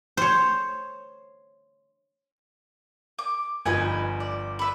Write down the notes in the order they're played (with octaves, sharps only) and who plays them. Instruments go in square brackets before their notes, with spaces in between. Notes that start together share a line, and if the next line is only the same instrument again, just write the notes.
[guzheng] C5 C#5
[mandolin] D6
[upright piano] G1 F3 G#6 [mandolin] D#4 B4 G#5
[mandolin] D5
B4 E5